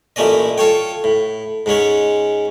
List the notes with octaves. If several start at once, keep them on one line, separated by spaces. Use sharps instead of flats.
A1 A#2 A3 C#4 D5 D#5
F4 A4 C#5 G5
A2
G#2 G#3 C#4 C#5